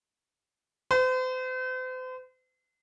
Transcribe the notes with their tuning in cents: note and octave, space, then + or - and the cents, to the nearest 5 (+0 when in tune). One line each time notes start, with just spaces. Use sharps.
C5 -40